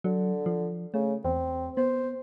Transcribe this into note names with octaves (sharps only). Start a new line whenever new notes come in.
D3 F#3
F3
C#3 A3
E2 C4
B3 C5